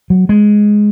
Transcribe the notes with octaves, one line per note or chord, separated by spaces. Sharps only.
F#3
G#3